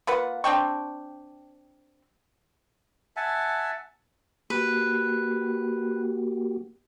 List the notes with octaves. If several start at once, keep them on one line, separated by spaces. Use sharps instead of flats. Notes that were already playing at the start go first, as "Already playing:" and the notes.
A#3 F4 B4 F#5
C4 D4 G5 C#6
E5 F#5 G#5 A5
A#3 F#4 G4 B4